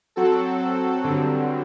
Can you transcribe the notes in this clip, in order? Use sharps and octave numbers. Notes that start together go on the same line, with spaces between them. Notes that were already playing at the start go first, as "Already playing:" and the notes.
F#3 C4 F#4 A4
G2 D3 F#3 C4